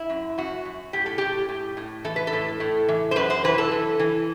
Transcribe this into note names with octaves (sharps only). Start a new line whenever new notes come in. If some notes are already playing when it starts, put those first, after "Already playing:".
Already playing: E4
F#2
F#2 F#4
F#2
A2 G4
A4
A2 G4
A2
A2
E3 A4
B4
A4
A2
A2
E3
C5
F#2 B4
C5
E3 B4
A4
E3
E3